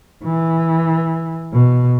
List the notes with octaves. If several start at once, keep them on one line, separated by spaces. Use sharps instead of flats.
E3
B2